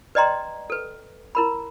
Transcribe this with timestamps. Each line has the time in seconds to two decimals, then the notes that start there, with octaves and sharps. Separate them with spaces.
0.15 B4 D5 D#5 G5 A#5 C6
0.70 A4 B4
1.35 E4 A#4 B5